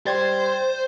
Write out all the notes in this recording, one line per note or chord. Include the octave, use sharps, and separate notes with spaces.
G3 C5 C6 G#6 A6